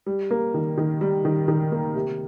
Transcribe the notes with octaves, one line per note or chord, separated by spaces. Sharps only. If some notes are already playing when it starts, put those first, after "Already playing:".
G3
A#3
D#3
D#3
G3
D#3
D#3
A#3
C3